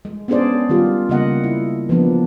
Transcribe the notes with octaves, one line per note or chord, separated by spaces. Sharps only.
G#3
B3 C#4 D4 G#4 C5 D5
D#3 G3 F4 G4
C#3 G3 A#3 D#5 F#5
E4
E3 F3 A#3 B3 D4